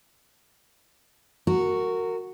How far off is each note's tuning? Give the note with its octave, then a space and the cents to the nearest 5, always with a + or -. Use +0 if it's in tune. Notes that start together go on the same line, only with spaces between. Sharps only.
F#4 +0 A#4 -25